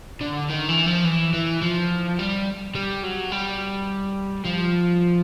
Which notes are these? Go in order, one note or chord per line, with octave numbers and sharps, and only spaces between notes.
D3
D#3
E3
F3
E3
E3
F3
G3
G3
F#3
G3
F3